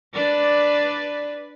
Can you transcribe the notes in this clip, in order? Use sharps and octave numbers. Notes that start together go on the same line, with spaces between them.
D4 B4 D5